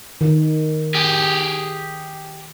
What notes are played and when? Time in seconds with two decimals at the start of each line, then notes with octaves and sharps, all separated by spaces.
0.21 D#3
0.95 G4 G#4